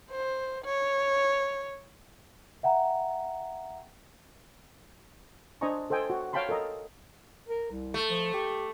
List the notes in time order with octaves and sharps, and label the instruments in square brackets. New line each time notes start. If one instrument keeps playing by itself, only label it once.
[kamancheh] C5
C#5
[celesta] E5 F#5 G5 A#5
[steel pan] D4 C5 D#5 G#5 A#5 C#6
A4 C5 D#5 G5 G#5
F#4
C#5 F5 G5 A5 B5 C6
A4 A#4 D#5 A#5
[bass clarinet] A#4
C2
[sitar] A3
[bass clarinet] F3
G4